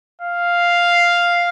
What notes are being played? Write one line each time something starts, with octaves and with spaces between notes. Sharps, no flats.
F5